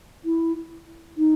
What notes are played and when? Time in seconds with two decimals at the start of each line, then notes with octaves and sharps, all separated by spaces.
0.25 E4
1.18 D#4